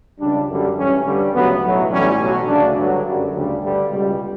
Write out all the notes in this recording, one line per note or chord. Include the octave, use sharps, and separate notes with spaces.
C#2 C#3 G3 D4
F#2 D3 G3
A1 G2 E3 C#4
G2 D3 G3
D2 C#3 F#3 B3
B1 A2 F#3
A1 A2 E3 G3 C#4
B1 B2 F#3
D2 C#3 F#3 D4
G2 D3 F#3
F#2 D3 G3
D2 C#3 G3
G2 D3 G3
C#2 B2 G3